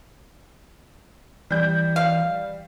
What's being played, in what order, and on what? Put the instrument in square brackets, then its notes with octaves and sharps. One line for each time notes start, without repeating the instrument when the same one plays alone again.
[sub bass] E3 [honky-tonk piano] G3 G6
[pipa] F5